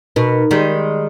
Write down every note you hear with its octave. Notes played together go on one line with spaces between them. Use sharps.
B2 D#4 A#4
D#3 G3 G#3